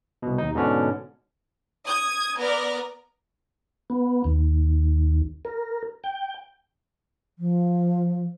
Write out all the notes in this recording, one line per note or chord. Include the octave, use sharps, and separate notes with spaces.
C2 B2
D#2 D#4
G#2 B2 D3 C#4 D4
D#6 G#6
B3 A#4 D5
B3
D#2
A#4
G5
F3